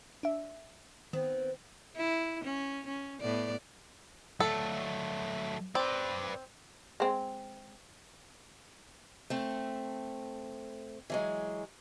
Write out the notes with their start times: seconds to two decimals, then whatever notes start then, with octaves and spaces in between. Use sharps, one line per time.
0.23 D4 E5
1.13 D#3 B3 C4
1.96 E4
2.44 C#4
2.87 C#4
3.21 A2 B3 D5
4.40 F#3 A3 A4
5.75 C4 B4 D5
7.00 G#3 C4
9.30 A3 C4
11.10 E3 F#3 G#3